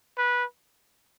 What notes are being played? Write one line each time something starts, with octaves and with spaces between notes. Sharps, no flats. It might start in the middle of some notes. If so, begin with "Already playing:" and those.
B4